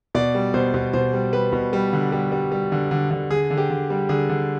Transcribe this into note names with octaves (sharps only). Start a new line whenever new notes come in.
B2 D5
G3
B2 C5
B2
B2 C5
G3
G3 B4
B2
G3
D3
G3
G3
G3
D3
D3
D3
D3 G#4
D3
G4
D3
G3
D3 G#4
D3